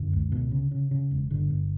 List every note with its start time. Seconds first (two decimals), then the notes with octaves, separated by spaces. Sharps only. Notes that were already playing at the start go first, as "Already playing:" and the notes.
Already playing: F#2 D3
0.13 C#2
0.32 B2
0.51 C#3
0.71 C#3
0.91 C#3
1.11 E1
1.30 G1 D3
1.50 G1